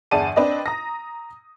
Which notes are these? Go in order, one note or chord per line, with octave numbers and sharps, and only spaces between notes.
G1 E2 G#4 D5 A5 D#7
C4 D4 B4 D5 D#5
A#5 D#6 A#6